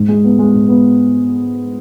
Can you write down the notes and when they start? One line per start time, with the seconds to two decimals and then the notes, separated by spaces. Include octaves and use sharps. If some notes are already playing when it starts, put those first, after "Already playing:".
Already playing: G#2
0.08 G#3
0.24 B3
0.39 G#3
0.54 G#2
0.68 B3